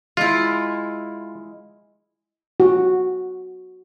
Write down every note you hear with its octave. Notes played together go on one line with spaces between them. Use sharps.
G#3 E4 F4
F#4